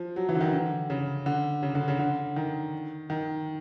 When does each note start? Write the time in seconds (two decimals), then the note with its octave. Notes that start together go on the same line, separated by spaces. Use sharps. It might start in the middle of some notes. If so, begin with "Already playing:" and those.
Already playing: F3
0.16 F#3
0.29 E3
0.35 D3
0.41 D#3
0.52 D3
0.90 C#3
1.26 D3
1.63 C#3
1.75 D3
1.88 C#3
1.99 D3
2.36 D#3
3.10 D#3